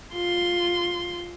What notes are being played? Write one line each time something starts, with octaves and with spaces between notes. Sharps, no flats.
F4 C6